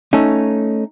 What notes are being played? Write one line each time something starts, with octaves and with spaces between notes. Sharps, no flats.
A3 C#4 D#4